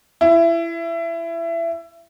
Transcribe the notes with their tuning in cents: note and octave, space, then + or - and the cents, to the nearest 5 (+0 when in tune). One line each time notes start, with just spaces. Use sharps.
E4 +25